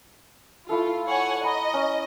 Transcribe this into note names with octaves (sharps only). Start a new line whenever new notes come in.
A3 E4 F4 A4
C#5 F#5 G#5
D#5 A#5 B5
C#4